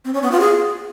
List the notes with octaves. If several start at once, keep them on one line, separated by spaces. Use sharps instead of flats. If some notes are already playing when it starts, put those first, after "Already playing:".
C4
C#4
B3
F4
G#4